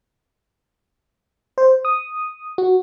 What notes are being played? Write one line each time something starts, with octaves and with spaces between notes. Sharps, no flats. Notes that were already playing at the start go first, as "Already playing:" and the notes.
C5
D#6
F#4